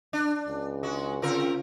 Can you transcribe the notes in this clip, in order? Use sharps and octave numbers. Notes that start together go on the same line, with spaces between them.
D4
C#2
G#3 F#4
C#3 C4 F4 A#4